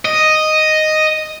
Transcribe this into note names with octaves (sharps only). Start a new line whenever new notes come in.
D#5